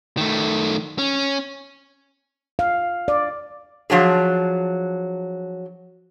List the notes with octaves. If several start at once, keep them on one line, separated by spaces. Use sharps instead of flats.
D#3 A3
C#4
F5
D5
F3 F#3 D4 G#4